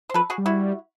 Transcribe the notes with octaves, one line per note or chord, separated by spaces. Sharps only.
C5
F3 A4 B4
F#4 G#4
G3
E4 F#4